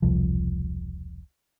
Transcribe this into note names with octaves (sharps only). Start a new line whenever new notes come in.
E1 C2 F3